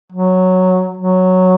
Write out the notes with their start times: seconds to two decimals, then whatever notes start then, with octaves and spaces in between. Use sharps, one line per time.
0.13 F#3
0.97 F#3